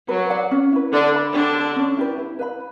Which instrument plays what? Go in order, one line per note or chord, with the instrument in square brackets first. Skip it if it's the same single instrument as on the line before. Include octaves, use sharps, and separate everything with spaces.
[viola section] F#3 [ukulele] B4
[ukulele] D5 F#5
C#4
E4 B4
[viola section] D3 D4 [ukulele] A4
[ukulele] E5 B5
[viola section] D3 D4 [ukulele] G4
[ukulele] D5 A5
C#4
E4 G4 B4
E4
B4 E5 B5